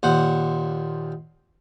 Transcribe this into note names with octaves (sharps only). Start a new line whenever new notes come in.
D#2 A#2 C5 F#5